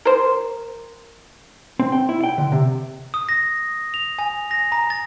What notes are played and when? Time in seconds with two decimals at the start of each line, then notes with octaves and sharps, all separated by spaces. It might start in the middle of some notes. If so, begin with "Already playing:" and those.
0.05 A#4 C5
1.79 C4
1.92 G5
2.09 E4
2.23 G5
2.38 D3
2.52 C3
3.14 D#6
3.29 A#6
3.94 F7
4.19 G#5
4.51 A#6
4.72 A#5
4.90 A6